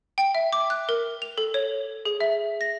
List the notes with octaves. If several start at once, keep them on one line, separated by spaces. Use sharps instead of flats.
G5
E5
D6
F#6
A#4
F7
A4
C#5
G#4
E5
A#6